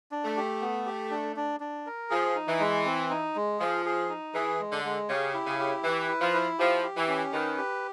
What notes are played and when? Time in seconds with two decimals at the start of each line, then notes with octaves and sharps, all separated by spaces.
0.12 D4
0.24 A3
0.37 G4
0.61 B3
0.86 G4
1.11 D4
1.36 D4
1.60 D4
1.86 A#4
2.10 F3 G#4
2.35 D#4
2.48 E3
2.60 G#3
2.85 C4
3.10 D#4
3.36 G#3
3.59 F3 G#4
3.85 G#4
4.09 D#4
4.34 E3 G#4
4.60 G#3
4.72 D3
4.84 G#3
5.09 C#3 G4
5.34 E4
5.47 C#3
5.60 G4
5.83 E3 B4
6.08 E4
6.21 F3
6.34 E4
6.59 F3 G4
6.83 G4
6.97 E3
7.08 C#4
7.33 D#3 B4
7.58 G4